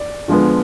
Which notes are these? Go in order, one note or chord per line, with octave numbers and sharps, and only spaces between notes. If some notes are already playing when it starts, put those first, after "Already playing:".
Already playing: D5
D3 F3 G#3 B3